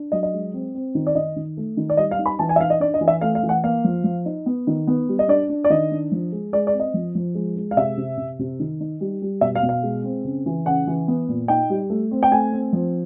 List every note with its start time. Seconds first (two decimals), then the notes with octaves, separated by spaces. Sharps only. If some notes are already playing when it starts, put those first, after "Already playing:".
Already playing: D4
0.12 F#3 D#5
0.23 D#5
0.33 G#3
0.54 C4
0.75 C4
0.95 D#3
1.07 D5
1.15 D#3 D#5
1.36 D#3
1.57 A3
1.77 D#3
1.90 D5
1.97 G3 D#5
2.11 F5
2.18 D#4
2.26 B5
2.39 E3 A5
2.49 G#5
2.56 E5
2.59 D#4 F5
2.70 D#5
2.80 D4 D5
2.94 D#5
3.01 E3
3.08 E5
3.21 A3 F5
3.35 F5
3.43 E3
3.49 F#5
3.64 A#3 F5
3.84 F3
4.04 F3
4.25 D#4
4.46 B3
4.67 D#3
4.87 B3
5.08 G3
5.19 D#5
5.28 D4 D5
5.49 D4
5.64 D5
5.70 D#3 D#5
5.91 D4
6.12 F3
6.32 G#3
6.53 G#3 D5
6.67 D5
6.74 C4
6.80 D#5
6.94 F3
7.15 F3
7.35 G#3
7.56 G#3
7.71 F5
7.76 C3 E5
7.97 C3
8.17 C3
8.39 C3
8.60 D#3
8.80 D#4
9.00 G3
9.22 G3
9.41 B2 E5
9.55 F5
9.63 B2
9.69 F5
9.83 G#3
10.04 C4
10.24 C#3
10.46 E3
10.66 C#3 F#5
10.87 E3
11.08 B3
11.28 A#2
11.48 D#4 G5
11.70 G3
11.90 A3
12.11 C4
12.23 G5
12.31 A3 G#5
12.52 C4
12.73 F3